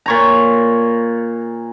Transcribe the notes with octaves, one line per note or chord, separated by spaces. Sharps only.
A#2 C#5 A#5